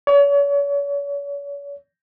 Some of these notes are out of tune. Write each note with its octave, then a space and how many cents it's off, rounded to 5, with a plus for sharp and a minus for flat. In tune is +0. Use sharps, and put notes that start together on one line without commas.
C#5 +40